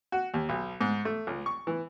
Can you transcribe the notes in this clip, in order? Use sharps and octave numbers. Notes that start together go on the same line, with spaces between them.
F#4
D#2
B1
G#2
A3
C#2
C#6
E3